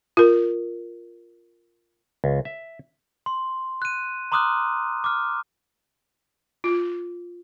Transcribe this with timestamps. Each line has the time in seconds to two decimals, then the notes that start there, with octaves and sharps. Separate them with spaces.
0.17 F4 A#4
2.24 C#2
2.45 E5
3.26 C6
3.82 F#6 D#7
4.32 A#5 C6 D6 D#6 F6 F#6
5.04 D6 F6
6.64 F4